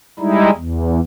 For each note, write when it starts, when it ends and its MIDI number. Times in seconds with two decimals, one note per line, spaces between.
0.19 0.50 55
0.19 0.50 56
0.19 0.50 63
0.19 0.50 64
0.56 1.00 40